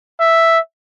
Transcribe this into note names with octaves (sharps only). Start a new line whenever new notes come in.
E5